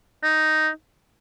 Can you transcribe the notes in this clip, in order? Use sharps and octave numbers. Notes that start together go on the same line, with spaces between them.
D#4